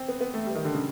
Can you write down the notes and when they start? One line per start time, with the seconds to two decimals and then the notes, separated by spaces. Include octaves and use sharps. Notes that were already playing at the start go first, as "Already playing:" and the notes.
Already playing: C4
0.08 B3
0.21 B3
0.34 A3
0.46 G3
0.56 D#3
0.65 D3
0.75 C#3